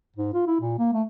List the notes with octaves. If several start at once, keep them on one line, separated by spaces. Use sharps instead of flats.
G#2
F4
E4
A#2
A#3
A3